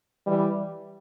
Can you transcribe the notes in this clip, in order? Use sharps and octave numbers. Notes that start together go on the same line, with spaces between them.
E3 G3